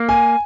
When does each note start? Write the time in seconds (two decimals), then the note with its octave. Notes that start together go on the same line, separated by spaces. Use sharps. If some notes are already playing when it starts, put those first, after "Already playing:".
Already playing: A#3
0.09 G#5